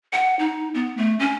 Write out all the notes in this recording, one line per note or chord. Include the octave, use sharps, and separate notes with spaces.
F#5
D#4
B3
A3
C#4